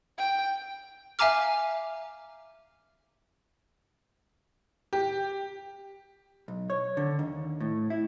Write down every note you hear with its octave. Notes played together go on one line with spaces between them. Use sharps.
G5
E5 F5 G#5 A#5 D6 F6
G4
B1
C#5
D3
D#2
A2
E4